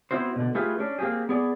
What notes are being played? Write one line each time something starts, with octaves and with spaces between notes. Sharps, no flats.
B3 C4 E4 F#4 C5
B2 D3
A3 E4 F4 G4 G#4 B4
C#4 D4
A#3 C4 E4 G4 G#4
B3 G#4 D5